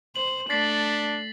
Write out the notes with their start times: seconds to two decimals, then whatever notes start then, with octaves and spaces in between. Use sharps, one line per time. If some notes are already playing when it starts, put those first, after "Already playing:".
0.16 C5 F#7
0.50 A3 D4 A6 B6 C7